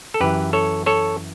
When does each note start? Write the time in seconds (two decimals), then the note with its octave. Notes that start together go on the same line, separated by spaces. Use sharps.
0.14 A4
0.20 F#2 E3 G4 B4
0.53 A4 C#5
0.86 A4 C#5